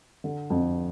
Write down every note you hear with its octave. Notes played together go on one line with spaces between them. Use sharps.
D3
F2